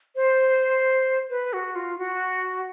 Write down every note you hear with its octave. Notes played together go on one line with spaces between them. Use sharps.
C5
B4
F#4
F4
F#4